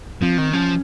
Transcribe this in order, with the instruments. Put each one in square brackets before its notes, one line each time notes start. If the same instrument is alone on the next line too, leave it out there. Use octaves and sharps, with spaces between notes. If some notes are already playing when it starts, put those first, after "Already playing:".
[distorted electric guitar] F3 [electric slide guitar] C4
[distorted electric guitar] D#3
[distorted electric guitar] F3 [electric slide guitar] C#4